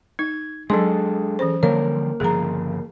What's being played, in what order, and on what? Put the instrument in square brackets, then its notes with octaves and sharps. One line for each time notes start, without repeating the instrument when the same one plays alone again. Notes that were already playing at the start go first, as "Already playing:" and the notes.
[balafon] D#4 [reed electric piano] G#6
[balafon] F#3 C6 [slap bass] G#3 D4 [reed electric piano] G#4 A4
[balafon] E3 C#4 C5
[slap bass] D3 F3 G3 [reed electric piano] A#3 A#4 [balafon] C#5
[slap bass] G1 C#3 F3 [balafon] G#4 A#5